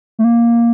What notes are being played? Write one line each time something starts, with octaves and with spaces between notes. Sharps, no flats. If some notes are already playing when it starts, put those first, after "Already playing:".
A3
A#3